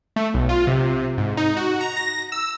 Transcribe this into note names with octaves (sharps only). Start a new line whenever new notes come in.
A3
B1
F4
C3
G#2
D#4
F#4
A#5
A#6
E6